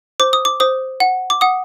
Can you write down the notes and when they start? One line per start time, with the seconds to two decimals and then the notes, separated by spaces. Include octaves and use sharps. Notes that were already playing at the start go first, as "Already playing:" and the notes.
0.20 C5 D6
0.33 D#6
0.45 D6
0.60 C5 D#6
1.00 F#5
1.30 D6
1.41 F#5 D#6